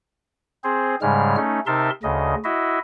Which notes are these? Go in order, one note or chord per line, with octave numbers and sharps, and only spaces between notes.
C4 G#4 C5
G#2 C#3 G3 G#3 F6
A3 C#4 D#4
C3 D#4 A#4 E5 A5 C6
D2 C#3 D#5
E4 F#4 D#5 E5